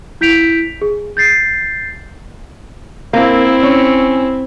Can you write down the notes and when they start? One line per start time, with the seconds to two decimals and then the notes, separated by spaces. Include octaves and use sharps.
0.21 E4 G6 B6 D7 F7
0.81 G#4
1.17 G6 A6 C7
3.13 A#3 C4 E4
3.63 C#4